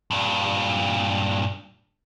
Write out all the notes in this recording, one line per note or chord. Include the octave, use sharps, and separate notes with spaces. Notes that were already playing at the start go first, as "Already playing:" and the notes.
G2 A#2